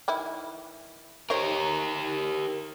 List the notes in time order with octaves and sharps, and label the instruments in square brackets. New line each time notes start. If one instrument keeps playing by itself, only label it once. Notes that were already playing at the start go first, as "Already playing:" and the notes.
[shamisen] D#3 E3 E4
[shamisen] D#4 C5 C#5 [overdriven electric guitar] G4 A#4